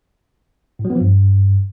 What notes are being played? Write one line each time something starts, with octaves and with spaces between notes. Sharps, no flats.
A2
F#3
B3
F3
G2